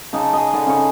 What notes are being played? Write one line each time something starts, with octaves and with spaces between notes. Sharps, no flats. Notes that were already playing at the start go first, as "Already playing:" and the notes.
C#3 D#4 A5 D6
G#4 D#5
D3 D4 D#4
C#3 C#4 C#6